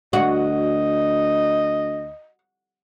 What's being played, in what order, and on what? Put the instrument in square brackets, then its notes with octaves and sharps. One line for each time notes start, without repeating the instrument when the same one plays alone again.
[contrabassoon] D2 [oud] F#4 [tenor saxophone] D#5